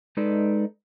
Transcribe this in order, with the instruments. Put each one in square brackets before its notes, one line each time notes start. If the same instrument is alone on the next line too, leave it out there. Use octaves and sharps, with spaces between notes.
[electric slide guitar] G#3 D#4 A4 B4 D5